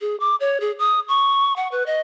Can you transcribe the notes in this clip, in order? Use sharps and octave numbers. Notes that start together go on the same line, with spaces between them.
G#4
D6
C#5
G#4
D#6
C#6
F#5
B4
D#5